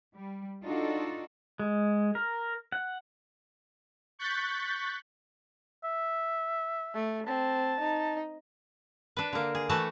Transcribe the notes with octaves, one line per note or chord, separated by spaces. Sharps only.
G3
D4 D#4 F4 F#4 A4
G#3
A#4
F#5
C#6 F#6 G6 A6 B6
E5
A3
C4 A5
D#4
D4 B4
D3 A#3
G#4
E3 A3 F#4 F#5 A5